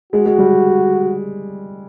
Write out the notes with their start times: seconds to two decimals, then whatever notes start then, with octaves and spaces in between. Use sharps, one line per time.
0.13 G#3 F#4
0.26 G#3
0.38 G3